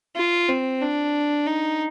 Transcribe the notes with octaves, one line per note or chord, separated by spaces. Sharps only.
F4
C4
D4
D#4